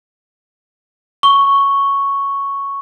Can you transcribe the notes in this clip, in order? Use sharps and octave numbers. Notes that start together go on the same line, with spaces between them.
C#6 G7